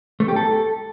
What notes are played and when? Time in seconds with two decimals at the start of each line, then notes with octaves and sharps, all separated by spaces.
0.20 A3
0.28 G4
0.36 A4